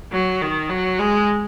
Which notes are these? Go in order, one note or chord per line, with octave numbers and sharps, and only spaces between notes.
F#3
D#3
F#3
G#3